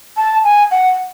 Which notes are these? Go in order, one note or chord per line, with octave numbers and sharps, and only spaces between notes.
A5
G#5
F#5